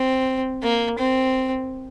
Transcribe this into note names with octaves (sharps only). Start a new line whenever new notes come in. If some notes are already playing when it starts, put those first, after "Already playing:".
Already playing: C4
A#3
C4